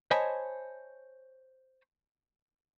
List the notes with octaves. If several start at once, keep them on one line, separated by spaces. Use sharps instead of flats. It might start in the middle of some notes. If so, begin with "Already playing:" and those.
C5 C#5 D#5 G#5 A5 B5